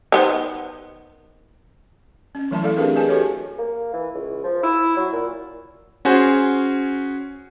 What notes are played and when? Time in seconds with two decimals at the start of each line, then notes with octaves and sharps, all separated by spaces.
0.12 D#3 B3 C5
2.35 C#4
2.51 E3 F#3 A3 E4 E5 A5
2.63 A3 A4 D5 F5
2.77 C4 D4 G4 G#4 A#4 B4
2.96 G#4 B4 D#5 G#5 A5
3.08 F#4 G4 A4 B4 C#5
3.58 A#3
3.94 E3
4.14 C#2
4.44 F3
4.63 E4
4.97 F#3
5.13 A#2
6.05 C#4 F#4 G#4 C5